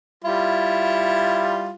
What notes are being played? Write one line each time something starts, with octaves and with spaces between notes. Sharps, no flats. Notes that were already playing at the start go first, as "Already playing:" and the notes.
G3 E4 F4